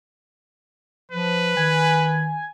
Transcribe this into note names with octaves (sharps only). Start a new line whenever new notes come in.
F3 B4
D#3 G#5